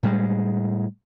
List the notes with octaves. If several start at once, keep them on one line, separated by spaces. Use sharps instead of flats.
A2 G3 G#3